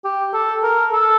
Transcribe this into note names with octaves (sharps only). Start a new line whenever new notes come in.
G4
A4
A#4
A4